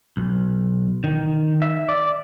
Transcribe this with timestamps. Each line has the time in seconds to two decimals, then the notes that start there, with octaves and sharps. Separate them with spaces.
0.17 B1
1.04 D#3
1.62 E5
1.89 D5